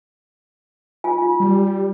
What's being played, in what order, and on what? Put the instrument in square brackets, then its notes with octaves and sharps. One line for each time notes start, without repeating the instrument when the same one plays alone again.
[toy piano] F4 G#5
F4
[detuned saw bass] G3